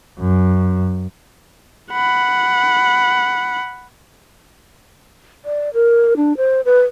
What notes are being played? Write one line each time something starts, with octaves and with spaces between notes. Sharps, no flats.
F#2
F#5 B5
D5
A#4
D4
C5
B4